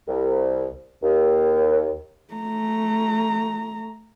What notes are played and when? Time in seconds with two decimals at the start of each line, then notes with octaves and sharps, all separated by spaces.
0.08 C2
1.03 D#2
2.34 A3 A#5